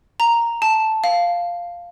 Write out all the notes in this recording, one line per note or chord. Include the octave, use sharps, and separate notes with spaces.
A#5
A5
F5